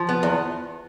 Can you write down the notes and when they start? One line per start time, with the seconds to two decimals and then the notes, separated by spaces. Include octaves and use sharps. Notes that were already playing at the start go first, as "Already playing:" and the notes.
Already playing: F3
0.09 B3
0.23 E2